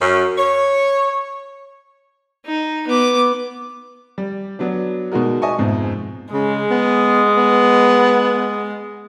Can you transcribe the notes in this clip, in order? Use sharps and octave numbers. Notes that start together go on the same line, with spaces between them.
F#2
C#5
D#4
B3 D6
G3
F#3 B3 D4
B2 G#3 D#4 F#4 A#4
D#5 E5 G#5 A5 C#6
F2 G#2 B2
C#3 G#3
B3
B3